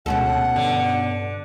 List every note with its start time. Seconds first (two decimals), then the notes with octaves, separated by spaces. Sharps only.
0.06 D2 B2 G#3 C#4 A4 F#5
0.56 G2 D3